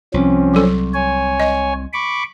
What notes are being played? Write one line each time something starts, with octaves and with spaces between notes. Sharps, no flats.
C2 F3 C4 C#4
F#3 A4
C#5 G#5
D#5
B5 C#6 D6